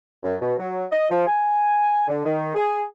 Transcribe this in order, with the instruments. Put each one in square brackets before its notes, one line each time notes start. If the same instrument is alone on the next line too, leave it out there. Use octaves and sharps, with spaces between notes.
[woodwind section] F#2
B2
F#3
D#5
F3
G#5
D3
D#3
G#4